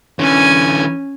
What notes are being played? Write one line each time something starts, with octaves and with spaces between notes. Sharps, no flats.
D3 E3 C#4 G#5